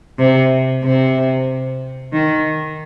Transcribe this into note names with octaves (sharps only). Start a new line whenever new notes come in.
C3
C3
D#3